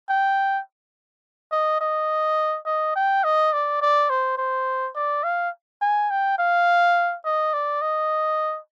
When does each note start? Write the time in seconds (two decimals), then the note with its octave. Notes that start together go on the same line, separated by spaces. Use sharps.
0.09 G5
1.52 D#5
1.81 D#5
2.66 D#5
2.96 G5
3.24 D#5
3.53 D5
3.81 D5
4.10 C5
4.38 C5
4.95 D5
5.24 F5
5.82 G#5
6.10 G5
6.38 F5
7.25 D#5
7.54 D5
7.82 D#5